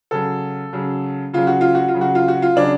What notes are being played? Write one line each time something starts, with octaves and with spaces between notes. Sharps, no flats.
C#3 F#3 A4
C#3 F#3
C#3 F#3 F4
F#4
F4
F#4
F4
C#3 F#3
F#4
F4
F#4
F4
C#3 F#3 D4